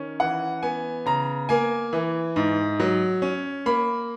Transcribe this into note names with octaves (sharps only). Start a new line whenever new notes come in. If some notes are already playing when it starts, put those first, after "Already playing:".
Already playing: D#3 C#4
E3 F#5
B3 G#5
C#3 A#5
A#3 G#5
E3
G#2
F#3
C#4
A#3 B5